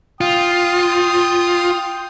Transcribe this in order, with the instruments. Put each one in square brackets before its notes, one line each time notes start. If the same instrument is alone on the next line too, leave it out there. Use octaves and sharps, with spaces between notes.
[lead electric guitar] F4 [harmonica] G5 D#6